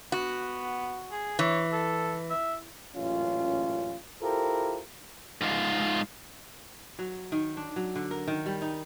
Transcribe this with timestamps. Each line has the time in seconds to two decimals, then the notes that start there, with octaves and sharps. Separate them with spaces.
0.12 B3 F#4
1.11 G#4
1.39 E3 C#5
1.72 A4
2.30 E5
2.95 A1 F#2 A#2 C#4 F4
4.22 E4 F4 G4 A4 A#4 C5
5.41 G#2 F4
6.99 F#3
7.32 D#3
7.57 D4
7.76 F#3
7.95 D3
8.11 A#4
8.27 D#3
8.46 G3
8.62 D#4